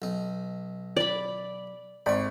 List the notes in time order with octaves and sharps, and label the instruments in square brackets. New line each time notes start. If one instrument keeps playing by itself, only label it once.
[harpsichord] B1 D#4
[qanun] D5 B5
[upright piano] G#1 D5 [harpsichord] B5 C#6